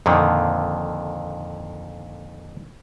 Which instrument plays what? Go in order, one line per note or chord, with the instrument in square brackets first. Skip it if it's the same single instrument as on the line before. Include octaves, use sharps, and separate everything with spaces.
[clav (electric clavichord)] F2 A#2 D3 D#3